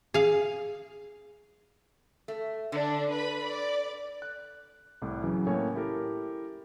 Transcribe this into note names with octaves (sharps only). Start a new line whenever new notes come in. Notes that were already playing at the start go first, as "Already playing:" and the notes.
G#4 F5
A3
D3 D4
B4 B5
D5
F#6
C2 A2 D6
C#3 E3 F#3
A2 A#3 C#4 A4 C#5 G#5
E4 G4 A4 A#4